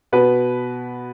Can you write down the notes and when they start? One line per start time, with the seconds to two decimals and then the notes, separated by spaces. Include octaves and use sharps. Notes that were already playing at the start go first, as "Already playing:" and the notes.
0.13 B2 B3 B4